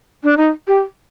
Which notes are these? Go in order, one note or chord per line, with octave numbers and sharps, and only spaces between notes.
D4
D#4
G4